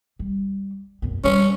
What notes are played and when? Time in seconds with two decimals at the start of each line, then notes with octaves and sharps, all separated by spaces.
0.19 G3
1.02 F#2 B3
1.24 G3 C#4 D4